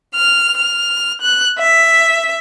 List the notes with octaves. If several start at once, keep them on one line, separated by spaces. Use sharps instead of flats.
F6
F6
F#6
E5